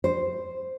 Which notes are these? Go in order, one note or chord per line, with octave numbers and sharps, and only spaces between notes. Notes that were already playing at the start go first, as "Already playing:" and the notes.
C5